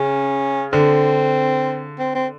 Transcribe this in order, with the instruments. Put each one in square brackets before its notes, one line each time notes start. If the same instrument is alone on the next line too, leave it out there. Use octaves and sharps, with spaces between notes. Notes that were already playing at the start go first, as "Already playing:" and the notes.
Already playing: [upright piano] C#3 [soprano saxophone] C#4
[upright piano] D3 [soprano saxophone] C4
[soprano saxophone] C4
C4